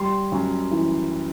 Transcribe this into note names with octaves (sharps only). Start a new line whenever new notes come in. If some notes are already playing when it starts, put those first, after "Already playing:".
Already playing: G3 C6
F#2
E3